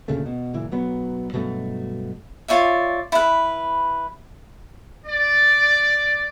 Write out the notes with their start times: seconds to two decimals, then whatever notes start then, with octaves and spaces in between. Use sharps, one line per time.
0.08 D2 A#2 C#3 A3
0.26 B2
0.53 F#1 A#2 E3
0.72 B1 F#3 B3
1.33 G2 B2 F#3 A3
2.48 F4 C#5 D5 E5
3.12 E4 B4
5.06 D5